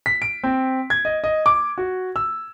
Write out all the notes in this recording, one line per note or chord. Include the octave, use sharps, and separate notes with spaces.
B6
D7
C4
G#6
D#5
D#5
D6
F#4
E6